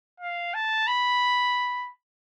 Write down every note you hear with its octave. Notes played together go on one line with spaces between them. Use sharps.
F5
A5
B5